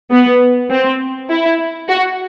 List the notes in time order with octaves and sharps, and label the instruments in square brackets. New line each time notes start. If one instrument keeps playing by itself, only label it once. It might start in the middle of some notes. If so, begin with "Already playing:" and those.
[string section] B3
C4
E4
F#4